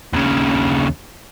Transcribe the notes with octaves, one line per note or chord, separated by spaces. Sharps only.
D#2 C#3